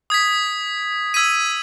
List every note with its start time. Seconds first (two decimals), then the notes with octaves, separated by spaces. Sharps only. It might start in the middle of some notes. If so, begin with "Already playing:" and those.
0.10 D#6 G#6 B6
1.14 E6 G#6 B6 D#7